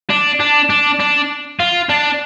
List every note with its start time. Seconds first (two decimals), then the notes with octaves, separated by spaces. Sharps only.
0.10 D4
0.40 D4
0.70 D4
1.00 D4
1.60 F4
1.89 D4